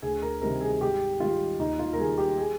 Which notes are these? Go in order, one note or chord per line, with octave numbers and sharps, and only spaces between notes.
D2 G#4
A#4
C3 D#3 G3 A#4
G#4
G#2 G4
D#3 G3 F4
D#2 D#4
F4
A#4
D#3 G3 G#4
G4
G#4